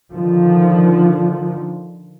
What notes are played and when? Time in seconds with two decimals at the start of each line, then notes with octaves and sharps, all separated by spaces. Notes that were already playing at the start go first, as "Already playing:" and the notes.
0.13 D3 D#3 F3